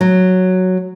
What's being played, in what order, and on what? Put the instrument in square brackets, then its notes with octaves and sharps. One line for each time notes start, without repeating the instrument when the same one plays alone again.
[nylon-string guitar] F#3